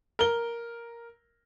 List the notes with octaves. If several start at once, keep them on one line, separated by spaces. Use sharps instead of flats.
A#4 G7